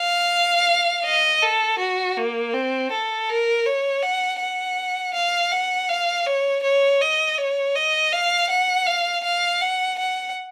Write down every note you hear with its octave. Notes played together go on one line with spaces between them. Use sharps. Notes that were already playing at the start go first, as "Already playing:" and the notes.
Already playing: F5
D#5
A4
F#4
A#3
C4
A4
A#4
C#5
F#5
F#5
F5
F#5
F5
C#5
C#5
D#5
C#5
D#5
F5
F#5
F5
F5
F#5
F#5